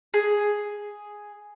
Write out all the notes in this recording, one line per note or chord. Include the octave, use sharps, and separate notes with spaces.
G#4